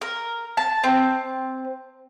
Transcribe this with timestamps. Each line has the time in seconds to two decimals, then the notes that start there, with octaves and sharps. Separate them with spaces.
0.01 A#4
0.57 A5
0.84 C4